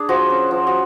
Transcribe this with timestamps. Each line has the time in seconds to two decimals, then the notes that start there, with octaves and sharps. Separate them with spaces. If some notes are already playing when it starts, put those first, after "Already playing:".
Already playing: D4 G#4
0.09 F3 F#4
0.30 C#4
0.51 F3
0.67 F#4